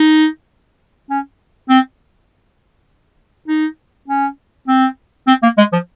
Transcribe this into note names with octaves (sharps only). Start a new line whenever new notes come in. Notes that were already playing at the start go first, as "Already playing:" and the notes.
Already playing: D#4
C#4
C4
D#4
C#4
C4
C4
A#3
G#3
F3